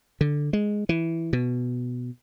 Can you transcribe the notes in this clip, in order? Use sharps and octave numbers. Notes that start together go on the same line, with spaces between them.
D3
G#3
E3
B2